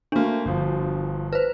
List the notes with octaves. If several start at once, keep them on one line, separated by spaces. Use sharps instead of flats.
A3 A#3 D4 F#4
G1 F3
B4 C5